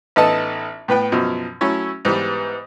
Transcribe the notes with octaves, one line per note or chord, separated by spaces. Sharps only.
A1 B3 D#4 A4 D#5 A5
A2 B3 B4 G5
F#2 B2 F3
F#3 A3 C#4 E4 C#5
G#2 E3 G3 B3